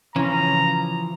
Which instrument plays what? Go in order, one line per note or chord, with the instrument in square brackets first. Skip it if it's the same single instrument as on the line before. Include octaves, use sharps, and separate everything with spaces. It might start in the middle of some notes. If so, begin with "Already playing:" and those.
[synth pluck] C#3 C#4 [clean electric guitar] E3 F3 [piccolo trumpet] A#5